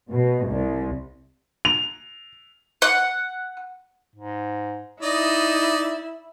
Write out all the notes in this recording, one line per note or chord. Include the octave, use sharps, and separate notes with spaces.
B2
C2
F7
F#5
G#2
D#4 E4 D5 D#5